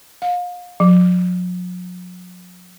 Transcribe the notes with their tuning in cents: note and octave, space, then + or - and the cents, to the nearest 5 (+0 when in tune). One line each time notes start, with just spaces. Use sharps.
F5 +35
F#3 -45